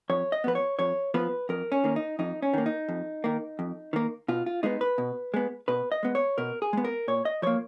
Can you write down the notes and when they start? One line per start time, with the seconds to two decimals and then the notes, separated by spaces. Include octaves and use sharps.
0.10 F2 C#5
0.32 D#5
0.44 F3 B3 B4
0.55 C#5
0.79 F2 C#5
1.14 F3 B3 B4
1.49 F2 A#4
1.72 C#4
1.84 D#3 A#3
1.96 D#4
2.19 F2 D#4
2.42 C#4
2.53 D#3 A#3
2.66 D#4
2.89 F2
3.24 D#3 A#3
3.59 F2
3.93 D#3 A#3
4.28 B2 F4
4.46 F4
4.63 G#3 B3 D#4
4.81 B4
4.98 B2
5.34 G#3 B3
5.68 B2 B4
5.92 D#5
6.03 G#3 B3
6.15 C#5
6.38 B2 A#4
6.62 G#4
6.73 G#3 B3
6.85 A#4
7.08 A#2 C#5
7.25 D#5
7.42 F3 A#3 C#5